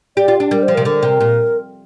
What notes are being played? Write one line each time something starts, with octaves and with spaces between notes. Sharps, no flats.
G4 D5
F4
D4
G3 A#4
C5
F3
A#4
C3
D3 A#4
C3
A#2